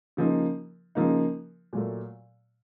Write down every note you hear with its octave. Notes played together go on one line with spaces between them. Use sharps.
C#3 F3 A#3 D#4
C#3 F3 A#3 D#4
A#2 F#3 A3